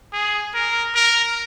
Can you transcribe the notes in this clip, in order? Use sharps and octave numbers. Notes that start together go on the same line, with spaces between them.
G#4
A#4
A#4